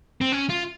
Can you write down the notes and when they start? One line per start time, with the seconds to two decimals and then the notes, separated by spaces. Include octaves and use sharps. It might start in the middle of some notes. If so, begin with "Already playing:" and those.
0.21 C4
0.32 C#4
0.49 F4